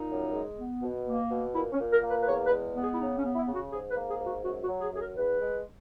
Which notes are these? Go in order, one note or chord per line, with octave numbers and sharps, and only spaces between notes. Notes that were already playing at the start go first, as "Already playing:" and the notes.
Already playing: A#2 D#4
F#2
G#3
B3
B2
A#3
B2
A#2 E4
C#4
A#2
A#4
A#3
B4
B4
E2 C#5
B4
G#3
B3
G#4
E4
C#3 D#4
C#4
B3
E4
C#3
F#4
G#2 G#4
B4
A#3
G#4
G#2
F#4
F#2 F#4
F#4
F#3
G#4
F#2 G#4
A#4
E2 B4
G#3